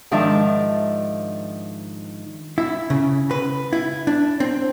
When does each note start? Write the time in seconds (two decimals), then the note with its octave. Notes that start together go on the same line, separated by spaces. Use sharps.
0.11 G#2 D#3 F3 D4 E5 A5
2.58 E4
2.90 C#3
3.31 B4
3.73 E4
4.07 D4
4.40 C4